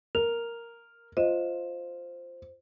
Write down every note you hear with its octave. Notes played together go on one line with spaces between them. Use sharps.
A#4 F7
F4 C5 D#5 E7